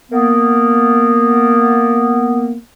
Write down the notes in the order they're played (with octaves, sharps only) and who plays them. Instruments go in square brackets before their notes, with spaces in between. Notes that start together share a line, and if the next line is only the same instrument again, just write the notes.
[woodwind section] A#3 B3